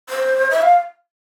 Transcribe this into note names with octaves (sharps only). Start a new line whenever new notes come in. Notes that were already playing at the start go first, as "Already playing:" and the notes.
C5
E5
F5